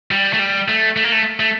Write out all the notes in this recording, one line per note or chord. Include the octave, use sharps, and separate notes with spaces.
G3
A3
G3
A3
A3
A#3
A3
A3